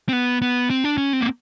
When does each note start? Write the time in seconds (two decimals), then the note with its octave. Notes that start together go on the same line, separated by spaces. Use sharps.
0.09 C4
0.13 B3
0.42 B3
0.70 C4
0.84 D4
0.98 C#4
1.13 C4
1.21 A#3